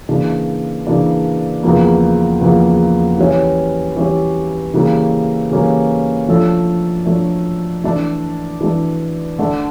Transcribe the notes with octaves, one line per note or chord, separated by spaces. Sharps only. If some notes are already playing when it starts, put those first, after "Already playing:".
C#3 E3 A#3 D4
C#3 E3 A#3 D4
E2 C#3 F3 A#3
E2 C#3 F3 A#3
E3 G3 C#4 G4 C#5
E3 G3 C#4 G4 C#5
C#3 E3 G3 A#3 C#4
C#3 E3 G3 A#3 C#4
F3 A3 D4 A4 C#5
F3 A3 D4 A4 C#5
E3 A3 D4
E3 A3 D4
D3 A3 D4